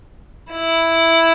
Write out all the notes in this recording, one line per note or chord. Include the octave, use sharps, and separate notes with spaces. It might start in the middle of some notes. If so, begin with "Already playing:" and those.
E4